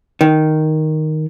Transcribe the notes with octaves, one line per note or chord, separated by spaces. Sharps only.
D#3